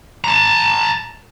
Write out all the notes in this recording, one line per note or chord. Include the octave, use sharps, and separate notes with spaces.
A5 A#5